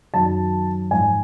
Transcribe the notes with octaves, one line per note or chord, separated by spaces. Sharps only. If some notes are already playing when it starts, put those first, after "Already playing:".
F#2 D#3 F#3 A5
G#2 F3 G#5